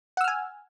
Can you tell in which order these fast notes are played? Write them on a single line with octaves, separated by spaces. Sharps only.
F#5 E6 F6 G#5